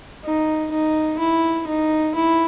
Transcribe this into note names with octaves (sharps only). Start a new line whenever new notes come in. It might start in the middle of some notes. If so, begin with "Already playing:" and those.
D#4
D#4
E4
D#4
E4